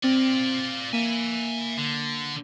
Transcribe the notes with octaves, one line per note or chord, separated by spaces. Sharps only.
C4 F4 D5
A#3 E5 G#5
D3